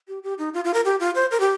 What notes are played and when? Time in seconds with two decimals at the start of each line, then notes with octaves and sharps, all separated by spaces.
0.08 G4
0.23 G4
0.38 D#4
0.54 F4
0.65 F4
0.74 A#4
0.85 G4
1.00 F4
1.15 C5
1.31 A#4
1.40 G4